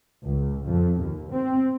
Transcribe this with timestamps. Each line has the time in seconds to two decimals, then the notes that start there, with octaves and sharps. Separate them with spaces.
0.24 C#2
0.66 F2
1.00 D#2
1.32 C4